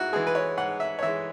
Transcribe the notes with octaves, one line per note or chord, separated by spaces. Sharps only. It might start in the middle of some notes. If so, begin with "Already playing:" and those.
Already playing: G#2 E4 F#4
E3 G#3 G#4
B4
C#5
G#2 F#5
E5
C#5
E3 G#3 E5